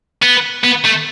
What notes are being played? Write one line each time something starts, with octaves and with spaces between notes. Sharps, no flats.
B3
B3
A3